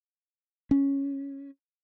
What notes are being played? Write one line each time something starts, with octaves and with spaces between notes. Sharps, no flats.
C#4